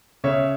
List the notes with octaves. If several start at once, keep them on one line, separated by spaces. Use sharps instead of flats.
C#3 C#5 E5